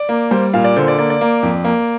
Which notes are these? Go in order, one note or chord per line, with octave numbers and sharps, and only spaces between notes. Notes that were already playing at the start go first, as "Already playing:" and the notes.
Already playing: D5
A#3
G3 C5
A#2 F5
D5
D3 C5
D5
A#3 D5
D5
A#3
F2
A#3